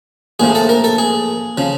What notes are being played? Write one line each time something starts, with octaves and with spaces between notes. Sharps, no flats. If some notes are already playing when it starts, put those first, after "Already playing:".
A#1 A2 F3 G#4
A4
A#4
A4
G#4
C#3 F3